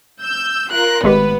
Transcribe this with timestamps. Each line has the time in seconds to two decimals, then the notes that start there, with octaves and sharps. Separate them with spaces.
0.23 E6 G6
0.71 F4 A#4 F#6
1.04 G#1 A2 G#3 B3 G4 B4